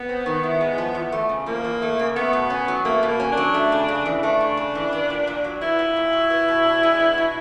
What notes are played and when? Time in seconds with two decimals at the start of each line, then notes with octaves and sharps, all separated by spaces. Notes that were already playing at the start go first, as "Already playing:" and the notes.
Already playing: B3
0.09 C4
0.26 D#3
0.43 E4
0.61 G#3
0.78 F3
0.95 E2
1.12 A3
1.29 C#3
1.46 F3 A#3
1.65 E2
1.82 A3
1.99 C#3
2.16 A3 B3
2.33 B2
2.50 C#4
2.68 F#3
2.85 A3 A#3
3.03 B2
3.08 A#3
3.20 C#4
3.32 D4
3.37 F#3
3.54 A3
3.72 C#3
3.88 C#3
4.06 E3
4.23 A3 D4
4.41 C#3
4.57 C#3
4.75 E3
4.93 B3
5.10 A#2
5.27 A#2
5.44 F#3
5.61 B3 E4
5.79 A#2
5.96 A#2
6.13 F#3
6.30 B3
6.48 B2
6.65 D4
6.83 G#3
6.99 B3
7.18 B2